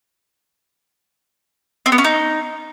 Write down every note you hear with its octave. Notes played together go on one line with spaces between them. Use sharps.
C4
B3
C#4
D#4